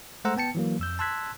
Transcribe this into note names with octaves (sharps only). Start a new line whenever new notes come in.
G#3 A3 C5 F#5 A#5 E6
B3 G5 A5 C#7
E3 F#3 A#3
F2 E6 G6
A5 C6 E6 F#6 G#6 B6